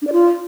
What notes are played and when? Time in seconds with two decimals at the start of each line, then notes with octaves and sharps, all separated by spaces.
0.02 D4
0.07 D5
0.13 F4